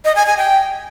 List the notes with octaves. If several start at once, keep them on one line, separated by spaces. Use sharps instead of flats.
D#5
G#5
G#5
G5